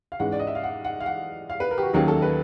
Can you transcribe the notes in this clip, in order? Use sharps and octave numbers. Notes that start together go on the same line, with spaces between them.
F5
G#2 E3 G#3 C#4 F#5
D5
D#5
E5
F5
F#5
F#5
F5
F#5
F5
B4
A#4
G4
F#4
D#2 D#3 F#3 A#3 C#4 G#4
A4
B4